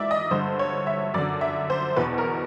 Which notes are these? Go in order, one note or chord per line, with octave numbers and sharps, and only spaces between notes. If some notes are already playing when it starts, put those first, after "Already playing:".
Already playing: G#2 E3 D5 E5
D#5
G2 D3 C5
C#5
E5
F#2 D3 D5
E5
C5
E2 B2 B4
A#4